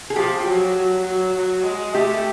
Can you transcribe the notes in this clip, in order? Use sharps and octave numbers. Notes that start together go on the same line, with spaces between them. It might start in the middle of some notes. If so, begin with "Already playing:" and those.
G#4
F3 G4
F#3
F#3
F#3
F#3
G#3
A3 G4